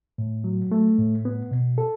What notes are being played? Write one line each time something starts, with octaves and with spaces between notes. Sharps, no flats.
A2
F#3
A3
A2
B3
B2
A4